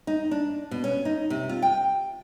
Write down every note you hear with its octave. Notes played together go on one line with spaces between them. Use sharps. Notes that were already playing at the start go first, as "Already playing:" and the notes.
D#4
D4
B2
C#4
D#4
C3
F4
G5